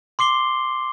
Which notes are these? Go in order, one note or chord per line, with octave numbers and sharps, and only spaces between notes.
C6 D6 C7 G7